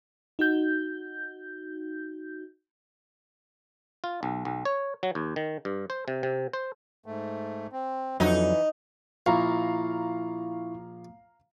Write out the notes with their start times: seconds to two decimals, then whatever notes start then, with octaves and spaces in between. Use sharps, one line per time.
0.39 D#4 F#4 G6
4.04 F4
4.23 B1
4.45 B1
4.65 C#5
5.03 F#3
5.15 D#2
5.36 D#3
5.65 G2
5.90 C5
6.08 C3
6.23 C3
6.53 C5
7.06 G#2 A3
7.73 C4
8.20 F2 D3 E3 F#3 D#4
9.26 A#1 E4 F5 A#5 C#6